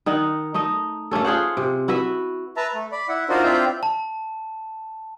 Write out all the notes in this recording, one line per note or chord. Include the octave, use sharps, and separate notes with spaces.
D#3 D#4 F#5
A3 D#4 D#5
A3 A#3 C#4 A4
F4 G#4 C5 F#5
C3
E4 F#4 B4 E5
B4 E5 A5 A#5
A3
D5 B5
E4 F#5
D4 D#4 F4 F#4 A#4 C5
C4 D4 E4 F4 G5
A5